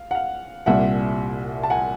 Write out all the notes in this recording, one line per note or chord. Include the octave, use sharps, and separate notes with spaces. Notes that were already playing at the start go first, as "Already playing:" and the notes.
Already playing: F5
F#5
F5
C2 A#2 G3 E5 F#5
A5
F#5 G#5